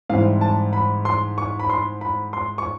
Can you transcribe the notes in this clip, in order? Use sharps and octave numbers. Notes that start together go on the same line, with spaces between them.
G#2 E3 G3 C4 F5
A5
B5
C6
C#6
B5
C6
B5
C6
C#6